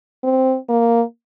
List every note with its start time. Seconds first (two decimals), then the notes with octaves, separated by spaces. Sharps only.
0.23 C4
0.69 A#3